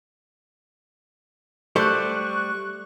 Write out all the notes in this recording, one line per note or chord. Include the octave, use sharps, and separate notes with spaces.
G3 A3 C5 C#6 F#6